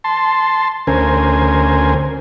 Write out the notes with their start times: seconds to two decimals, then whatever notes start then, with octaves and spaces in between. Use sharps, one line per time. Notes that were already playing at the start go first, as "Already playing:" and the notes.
0.04 A5 C6
0.87 D2 C#4 A#4 C5 G#5